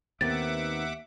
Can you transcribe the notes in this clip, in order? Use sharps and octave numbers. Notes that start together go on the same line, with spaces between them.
D#2 D#3 B3 C4 E5 F#5 D6 A6